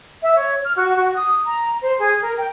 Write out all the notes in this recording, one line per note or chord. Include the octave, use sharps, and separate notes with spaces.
E5
C#5
F6
F#4
F#4
D#6
A#5
C5
G#4
A#4
G5